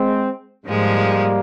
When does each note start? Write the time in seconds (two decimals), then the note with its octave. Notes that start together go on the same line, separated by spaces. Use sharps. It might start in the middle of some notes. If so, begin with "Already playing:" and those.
Already playing: G#3 C4
0.65 G#2 F3 G3 G#3 A#3